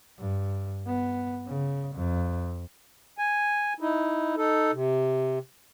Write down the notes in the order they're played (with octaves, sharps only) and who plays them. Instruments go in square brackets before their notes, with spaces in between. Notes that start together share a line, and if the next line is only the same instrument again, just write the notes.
[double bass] G2
B3
C#3
F2
[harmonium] G#5
D#4 E4
D#4 A4
C3